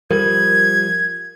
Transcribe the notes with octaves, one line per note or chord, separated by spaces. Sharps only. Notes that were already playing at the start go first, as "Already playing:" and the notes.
F3 G3 A#4 G#6